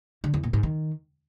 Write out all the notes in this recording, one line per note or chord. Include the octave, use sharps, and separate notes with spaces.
D3
E2
A#2
G#2
D#3